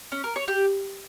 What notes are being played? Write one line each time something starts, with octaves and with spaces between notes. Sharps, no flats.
C#4
A#4
C#5
G4